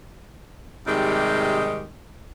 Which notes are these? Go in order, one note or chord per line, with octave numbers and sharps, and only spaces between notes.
G#2 C3 D#3 G3 G#3 G4